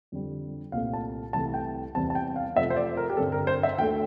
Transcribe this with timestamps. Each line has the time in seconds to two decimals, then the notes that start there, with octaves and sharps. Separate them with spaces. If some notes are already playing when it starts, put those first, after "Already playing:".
0.12 F2 D3 G3
0.72 C2 A#2 A3 C4 F5
0.93 A5
1.33 C2 C3 E3 A3 A5
1.54 G5
1.95 E2 C3 G3 C4 A5
2.10 A5
2.15 G5
2.36 F5
2.55 F2 C3 F3 A3 E5
2.70 C5
2.76 D5
2.97 A#4
3.10 G4
3.17 G2 D3 G3 C4 A4
3.32 A#4
3.47 C5
3.63 E5
3.78 D2 D3 A3 G5